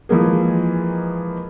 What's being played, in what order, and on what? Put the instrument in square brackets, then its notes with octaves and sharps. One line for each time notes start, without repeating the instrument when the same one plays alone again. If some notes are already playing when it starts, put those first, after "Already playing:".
[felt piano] E3 F3 G#3 A#3 G#4